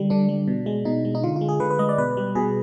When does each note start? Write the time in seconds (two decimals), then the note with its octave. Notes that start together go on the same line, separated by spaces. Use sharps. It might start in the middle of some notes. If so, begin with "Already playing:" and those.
Already playing: D3 G3 D4
0.10 D3 D4
0.29 G3
0.48 B2
0.66 G#3
0.85 B2 D#4
1.05 G#3
1.15 D#4
1.23 D3 F4
1.36 F4
1.41 G#3
1.49 G#4
1.60 D3 B4
1.71 B4
1.79 G#3 D#5
1.89 D5
1.98 B2 B4
2.17 G3
2.35 B2 G#4